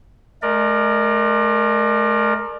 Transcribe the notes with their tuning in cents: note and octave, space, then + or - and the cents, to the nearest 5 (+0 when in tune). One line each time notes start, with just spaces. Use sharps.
A3 -40 A#4 +0 D5 +30